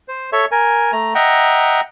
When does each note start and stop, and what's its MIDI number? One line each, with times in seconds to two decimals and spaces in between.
0.08 0.30 72
0.32 0.45 69
0.32 0.45 73
0.32 0.45 76
0.51 0.92 70
0.51 0.92 80
0.92 1.14 57
0.92 1.14 82
1.15 1.81 75
1.15 1.81 76
1.15 1.81 78
1.15 1.81 79
1.15 1.81 82